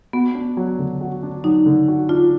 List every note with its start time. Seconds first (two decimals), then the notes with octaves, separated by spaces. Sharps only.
0.13 B3 F#4
0.35 D4
0.57 F#3
0.79 D3
1.01 F#4
1.23 D4
1.44 F#3 D#4
1.66 D3
1.88 F#4
2.09 D4 F4